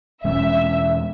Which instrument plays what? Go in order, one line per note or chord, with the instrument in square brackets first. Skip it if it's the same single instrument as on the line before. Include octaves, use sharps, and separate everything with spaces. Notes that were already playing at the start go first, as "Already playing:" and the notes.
[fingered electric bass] E2 B2 G#3 C#4 [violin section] E5